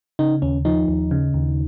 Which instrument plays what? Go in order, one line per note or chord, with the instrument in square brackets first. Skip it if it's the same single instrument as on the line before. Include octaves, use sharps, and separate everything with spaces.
[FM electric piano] C#3 D#4
D#2 C#4
F3 D#4
D#2
C#3
D#2